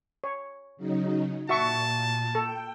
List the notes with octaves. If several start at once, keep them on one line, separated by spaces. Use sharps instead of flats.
C#5
C#3 F#3 D#4
A#2 F#4 E5 A5 C#6
A4 G5